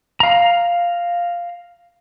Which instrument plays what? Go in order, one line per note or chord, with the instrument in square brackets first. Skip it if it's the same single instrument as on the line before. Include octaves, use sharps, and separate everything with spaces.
[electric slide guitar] F5 A#5